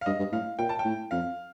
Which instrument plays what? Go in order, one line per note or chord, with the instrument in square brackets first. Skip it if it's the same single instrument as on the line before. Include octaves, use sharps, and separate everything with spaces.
[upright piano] F5
[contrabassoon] G2 [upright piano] D#5
[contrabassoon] G2
[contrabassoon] A2 [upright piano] F5
[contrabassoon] A#2 [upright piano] G5
[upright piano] A5
G5
[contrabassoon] A2
[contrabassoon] F2 [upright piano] F5